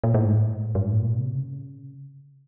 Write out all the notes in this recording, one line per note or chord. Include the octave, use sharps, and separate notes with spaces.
A#2
A2
G#2
A2
G2
G#2
A2
A#2
C3
C#3